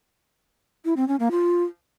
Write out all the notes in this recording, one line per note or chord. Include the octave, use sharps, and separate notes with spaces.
E4
C4
C#4
A#3
F4